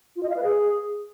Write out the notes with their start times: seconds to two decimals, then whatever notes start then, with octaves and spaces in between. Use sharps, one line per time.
0.16 F4
0.23 D#5
0.30 F5
0.37 B4
0.43 G#4